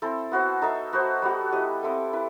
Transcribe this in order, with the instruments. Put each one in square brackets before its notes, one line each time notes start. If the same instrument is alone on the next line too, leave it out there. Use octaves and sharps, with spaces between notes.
[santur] C4 E4 A4
B3 F#4 C5
D#4 A4 E5
B3 F#4 C5
G3 B3 F#4
E4 G4 D#5
C4 E4 A4
E4 B4